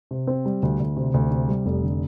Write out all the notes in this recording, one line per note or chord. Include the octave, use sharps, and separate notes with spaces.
C3
C4
G3
D2
D2
C3
D2
C3
G3
F1
D3